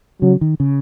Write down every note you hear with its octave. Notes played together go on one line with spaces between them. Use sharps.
C#3 F#3
D#3
C#3